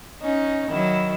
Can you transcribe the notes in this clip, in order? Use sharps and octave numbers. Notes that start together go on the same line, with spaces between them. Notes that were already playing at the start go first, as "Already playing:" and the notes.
C#4 D#4
D#3 F#3 E4